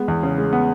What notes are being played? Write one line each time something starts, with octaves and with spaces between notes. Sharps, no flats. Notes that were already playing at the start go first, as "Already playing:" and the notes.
Already playing: G#3 B3
E2
C#3
G#3
B3